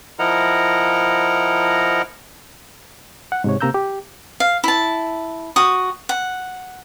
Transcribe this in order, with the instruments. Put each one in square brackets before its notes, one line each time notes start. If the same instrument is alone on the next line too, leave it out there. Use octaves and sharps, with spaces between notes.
[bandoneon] F3 E4 A#4 D#5 F#5 A#5
[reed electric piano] F#5
G#2 C3 C#5
C3 A#3 A#5 E6 G6
G4
[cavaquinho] F5
E4 A5
F#4 D#6
F#5